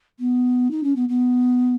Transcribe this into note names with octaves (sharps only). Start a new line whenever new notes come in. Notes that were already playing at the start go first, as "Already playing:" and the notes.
B3
D#4
C#4
B3
B3